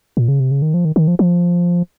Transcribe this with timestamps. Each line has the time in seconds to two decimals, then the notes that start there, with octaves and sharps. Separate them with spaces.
0.17 A#2
0.28 C#3
0.40 C3
0.51 C#3
0.62 D#3
0.74 F3
0.85 D#3
0.96 D#3
1.08 F3
1.19 F3